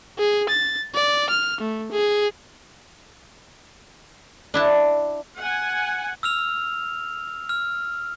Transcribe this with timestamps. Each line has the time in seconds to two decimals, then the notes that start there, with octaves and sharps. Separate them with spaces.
0.18 G#4
0.49 A6
0.95 D5
1.30 F6
1.61 A3
1.92 G#4
4.54 D4 E4 A5
5.39 F#5 G#5
6.23 E6 F6 F7
7.49 F6